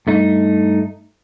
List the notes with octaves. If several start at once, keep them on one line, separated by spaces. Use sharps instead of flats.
G2 A3 D#4